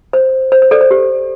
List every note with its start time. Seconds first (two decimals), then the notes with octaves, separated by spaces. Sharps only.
0.13 C5
0.52 C5
0.62 C5
0.71 A4 D5
0.81 C5
0.91 G4